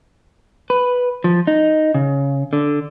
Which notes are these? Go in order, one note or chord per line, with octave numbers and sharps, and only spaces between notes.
B4
F3
D#4
C#3
D3